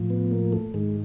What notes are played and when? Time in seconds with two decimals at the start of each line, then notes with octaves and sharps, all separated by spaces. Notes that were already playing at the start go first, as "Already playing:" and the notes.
Already playing: A2 F3
0.10 B3
0.31 A#3
0.53 A3
0.74 G#2 D#3 G#3